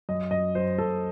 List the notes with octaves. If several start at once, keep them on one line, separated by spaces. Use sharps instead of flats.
F#2 D#5
F#2 D#5
F#2 C5
F#2 A4